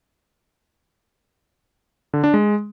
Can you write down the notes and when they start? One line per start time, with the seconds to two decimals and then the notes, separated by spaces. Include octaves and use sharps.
2.13 D3
2.24 D4
2.34 G#3